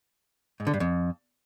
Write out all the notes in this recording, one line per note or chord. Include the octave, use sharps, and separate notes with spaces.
G#2
D3
G2
F2